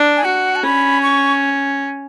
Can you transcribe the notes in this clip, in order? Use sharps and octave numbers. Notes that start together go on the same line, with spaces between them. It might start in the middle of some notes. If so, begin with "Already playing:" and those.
Already playing: D4
G#5
F#4 F#5
A5
C#4 B5
C#6